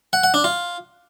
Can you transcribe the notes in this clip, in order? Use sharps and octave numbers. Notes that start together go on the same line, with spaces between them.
F#5
F#5
D4
F4